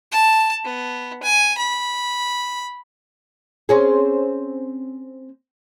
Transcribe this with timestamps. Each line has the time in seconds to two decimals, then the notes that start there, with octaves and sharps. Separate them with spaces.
0.12 A5
0.64 B3
1.23 G#5
1.58 B5
3.69 C4 C#4 G#4